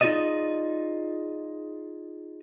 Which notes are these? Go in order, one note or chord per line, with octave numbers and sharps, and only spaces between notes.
D#4 F4 F#4 G#4 D5 D#5